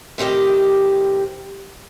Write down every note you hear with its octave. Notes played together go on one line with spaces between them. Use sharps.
A2 C3 D#3 G4 D#5